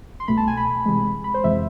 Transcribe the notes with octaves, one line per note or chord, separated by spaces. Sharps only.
C6
C2 B2 A3 B5
A5
G#5
B5
C3 E3 G#3
B5
C5
F2 C3 E3 G#3 E5